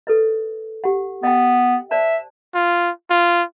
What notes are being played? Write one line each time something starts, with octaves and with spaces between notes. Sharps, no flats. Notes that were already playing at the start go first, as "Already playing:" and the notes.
A4 B4 D#5
G4 F#5
B3 D#5 G5
C5 D5 E5 A5
F4
F4